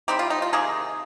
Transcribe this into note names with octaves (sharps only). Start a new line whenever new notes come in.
G3 C4 D#4 G4
F4
D#4
F4
C3 D#3 A#3 D#4 G#4